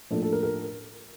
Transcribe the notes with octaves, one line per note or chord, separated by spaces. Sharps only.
A2 F3 A#3 D4 A4
A4
A#4
A#4